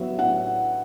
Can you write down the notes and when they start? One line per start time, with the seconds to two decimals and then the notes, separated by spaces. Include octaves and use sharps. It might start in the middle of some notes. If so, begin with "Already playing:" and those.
Already playing: A2 F#3 B3 E5
0.18 A2 F#5